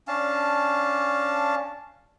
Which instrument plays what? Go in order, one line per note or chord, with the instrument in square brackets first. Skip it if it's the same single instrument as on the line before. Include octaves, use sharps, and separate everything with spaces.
[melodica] C#4 D4 F5 A5